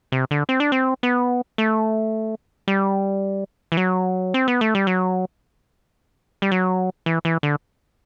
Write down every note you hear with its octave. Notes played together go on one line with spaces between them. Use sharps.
C3
D3
C4
D4
C4
B3
A3
G3
E3
F#3
C4
B3
A3
G3
F#3
G3
F#3
E3
E3
D3